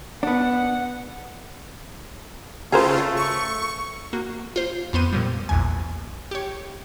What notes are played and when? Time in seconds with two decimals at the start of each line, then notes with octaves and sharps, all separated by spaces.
0.23 B3 D4 F#5
2.72 C#3 A3 F4 G#4 A#4 C5
3.17 C#6
4.13 A#3 F#4
4.56 F4 C5
4.93 F2 B3 C5 D#7
5.13 A#2 F3 G3
5.49 A#1 E2 G#5
6.31 G4 C#5